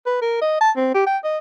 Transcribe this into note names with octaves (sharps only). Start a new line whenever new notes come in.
B4
A#4
D#5
A5
C4
G4
G5
D#5